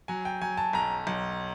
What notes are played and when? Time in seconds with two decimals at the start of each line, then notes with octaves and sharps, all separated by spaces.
0.08 F#3 G#5
0.25 G5
0.42 F#3 G#5
0.57 A5
0.73 B1 A#5
1.07 B1